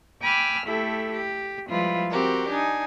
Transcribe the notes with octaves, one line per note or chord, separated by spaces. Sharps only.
G5 G#5 B5 D6 E6 F6
A3 E4 G4 A4
G4
F3 G3 G#3 E4 F4 B4
C4 F#4 G4 A#4
D4 D#4 G#5